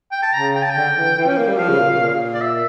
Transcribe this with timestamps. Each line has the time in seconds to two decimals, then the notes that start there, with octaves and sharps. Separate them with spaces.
0.12 G5
0.23 A5
0.34 C#3 A#5
0.55 G5
0.63 A5
0.70 G5
0.75 D3
0.96 E3
1.17 E3
1.27 C#4
1.37 A#3
1.48 G3
1.58 F3 F5
1.69 C#3
1.79 A#2
1.90 C#3
2.00 A#2
2.34 D5
2.41 E5